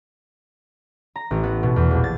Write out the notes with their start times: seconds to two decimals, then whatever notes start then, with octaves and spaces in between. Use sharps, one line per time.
1.16 A#5
1.31 A1
1.43 B3
1.63 B2
1.76 E2
1.91 A#1
2.04 A6